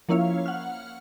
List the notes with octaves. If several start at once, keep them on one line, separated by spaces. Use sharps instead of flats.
F3 A#3 C#4 E4 C#5 F5
F#5 F6